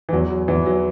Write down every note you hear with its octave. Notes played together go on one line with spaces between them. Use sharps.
E3
E2 F#3
F#3
E2 E3
F#3